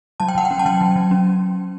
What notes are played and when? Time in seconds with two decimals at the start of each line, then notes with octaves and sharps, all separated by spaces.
0.20 F#3 A5
0.28 G5
0.35 F#3 F#5
0.45 G5
0.51 C#4
0.59 A5
0.66 F#3 G5
0.81 F#3
0.96 F#3
1.11 C#4